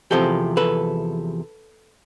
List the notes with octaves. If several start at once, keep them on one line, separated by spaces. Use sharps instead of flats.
E2 C3 F3 G4 A4
A4 B4